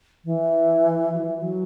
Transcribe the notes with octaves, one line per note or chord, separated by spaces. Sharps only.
E3
F#3
E3
F#3